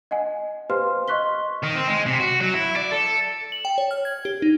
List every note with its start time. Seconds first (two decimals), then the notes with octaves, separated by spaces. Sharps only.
0.11 D#5 F#5 G#5
0.70 G4 B4 C5 F5 C6 F6
1.08 D#5 C6 C#6 F#6 B6 G7
1.63 D#3
1.75 C4
1.88 G#3
2.06 C3
2.20 F#4
2.40 F#3
2.54 E4
2.76 D5
2.92 A4
3.52 F#7
3.65 G5
3.78 C#5
3.91 F6
4.05 G#6
4.25 G4
4.42 D#4